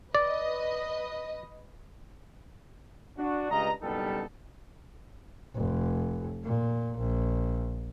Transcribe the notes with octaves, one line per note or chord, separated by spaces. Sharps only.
B4 D5 D#5
D4 F#4
C#2 G2 D#5 A#5
F#1 G2 B2 G3 D#4 A4
F1
A#2
A#1